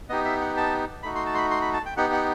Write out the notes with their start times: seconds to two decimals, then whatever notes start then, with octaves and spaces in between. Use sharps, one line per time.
0.09 B3 D#4 G4 D#5
0.25 E5
0.41 F#5
0.57 A5
1.03 A3 D#4 F#4 B5
1.15 C6
1.26 A5
1.35 C6
1.38 B5
1.51 C6
1.62 B5
1.74 A5
1.86 G5
1.97 B3 D#4 G4 F#5
2.13 F#5